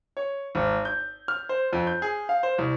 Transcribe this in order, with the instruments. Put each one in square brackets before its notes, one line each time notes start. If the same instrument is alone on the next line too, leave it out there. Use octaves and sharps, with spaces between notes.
[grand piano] C#5
G#1
G6
F6
C5
F2
G6
G#4
F5
C5
C2